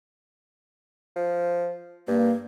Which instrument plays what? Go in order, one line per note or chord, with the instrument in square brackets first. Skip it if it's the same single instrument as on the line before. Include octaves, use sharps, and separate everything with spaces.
[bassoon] F3
[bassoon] G2 [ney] A#3